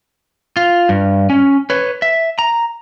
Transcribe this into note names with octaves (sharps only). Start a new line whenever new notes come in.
F4
G2
C#4
B4 C#5
E5
A#5